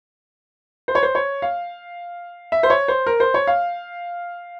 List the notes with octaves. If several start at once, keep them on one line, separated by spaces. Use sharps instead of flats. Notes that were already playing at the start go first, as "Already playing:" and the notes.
C5
C#5
C5
C#5
F5
E5
C5
C#5
C5
A#4
C5
C#5
F5